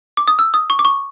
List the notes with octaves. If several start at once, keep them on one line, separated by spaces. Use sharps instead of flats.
D6
D#6
E6
D#6
C#6
D6
C#6